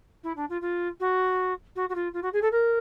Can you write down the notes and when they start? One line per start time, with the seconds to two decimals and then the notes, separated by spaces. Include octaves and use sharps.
0.23 E4
0.36 D4
0.49 F4
0.61 F4
1.00 F#4
1.76 F#4
1.89 F#4
1.95 F4
2.13 F4
2.22 F#4
2.33 G#4
2.42 A4
2.52 A#4